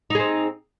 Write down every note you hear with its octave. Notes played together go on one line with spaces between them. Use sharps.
C4 D#4 G#4